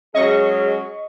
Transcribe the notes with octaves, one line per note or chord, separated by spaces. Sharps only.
F#3 G#3 C#4 G#4 D#5 C#6